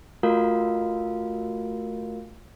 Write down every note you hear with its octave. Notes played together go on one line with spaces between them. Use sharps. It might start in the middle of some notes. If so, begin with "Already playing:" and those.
A3 F4 F#4 A#4 F5